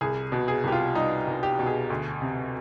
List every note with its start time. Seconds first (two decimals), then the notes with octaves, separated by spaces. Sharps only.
0.01 C2 G#4
0.32 B2
0.48 G#4
0.64 C2 G4
0.72 F4
0.95 G3 D#4
1.27 C2
1.43 G4
1.59 B2
1.66 G#4
1.90 D2
2.22 C3